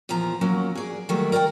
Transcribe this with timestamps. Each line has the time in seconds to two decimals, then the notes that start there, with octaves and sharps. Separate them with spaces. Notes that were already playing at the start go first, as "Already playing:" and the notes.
0.09 E2 A#2 F3 A#5
0.41 F#3 A#3 C#4 F#4
0.75 G#4 D5
1.09 D#3 F#3 G3 A3 A#3
1.32 A#4 D5 E5 G5